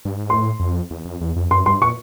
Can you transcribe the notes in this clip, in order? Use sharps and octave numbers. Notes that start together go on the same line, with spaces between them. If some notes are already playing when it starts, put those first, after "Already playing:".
G2
G#2
A2 C6
F2
E2
F2
E2
F2
F#2 C6
G2 C6
A#2 C#6